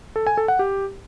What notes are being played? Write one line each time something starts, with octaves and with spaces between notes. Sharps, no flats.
A4
G#5
A4
F#5
G4